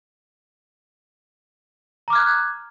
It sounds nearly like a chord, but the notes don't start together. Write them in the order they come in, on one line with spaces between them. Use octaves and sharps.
A#5 D6 F6 G#6 F#6